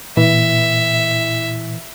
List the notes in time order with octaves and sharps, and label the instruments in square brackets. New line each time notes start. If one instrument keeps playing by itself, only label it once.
[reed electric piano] A#2 [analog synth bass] E3 [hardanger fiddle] E5